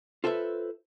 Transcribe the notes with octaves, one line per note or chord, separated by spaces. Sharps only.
F4 A4 B4 C5 E5